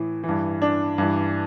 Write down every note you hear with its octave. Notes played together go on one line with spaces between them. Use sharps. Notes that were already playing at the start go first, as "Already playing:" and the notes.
Already playing: A2 E3
E3
G2
D4
G2 E3